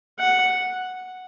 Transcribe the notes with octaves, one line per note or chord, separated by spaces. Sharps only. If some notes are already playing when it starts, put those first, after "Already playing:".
F#5